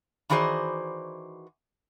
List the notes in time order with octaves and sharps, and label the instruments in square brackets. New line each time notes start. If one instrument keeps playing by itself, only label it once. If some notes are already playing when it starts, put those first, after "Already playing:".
[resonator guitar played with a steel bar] D#3 E3 F#4 G#4 C5 D5